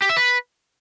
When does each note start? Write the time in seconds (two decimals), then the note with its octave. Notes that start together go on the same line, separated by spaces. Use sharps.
0.02 G4
0.09 E5
0.17 B4